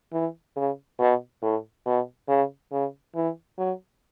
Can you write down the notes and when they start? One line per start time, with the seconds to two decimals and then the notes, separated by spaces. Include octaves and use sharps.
0.13 E3
0.56 C#3
0.99 B2
1.42 A2
1.86 B2
2.28 C#3
2.72 C#3
3.15 E3
3.58 F#3